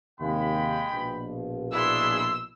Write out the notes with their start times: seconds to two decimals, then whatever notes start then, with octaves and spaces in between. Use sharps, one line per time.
0.20 D#2 C3 G#3 F5 G5 B5
0.92 A#1 B2 F3
1.72 D4 E4 G#4 C6 E6